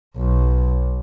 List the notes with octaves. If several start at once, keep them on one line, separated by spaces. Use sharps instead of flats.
B1